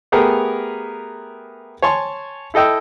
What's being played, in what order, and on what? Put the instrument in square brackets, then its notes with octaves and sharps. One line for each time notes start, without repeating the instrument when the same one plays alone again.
[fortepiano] A3 B3 G4 G#4 A#4
C#5 G#5 A5 C6 C#6
E4 A4 D#5 G5 E6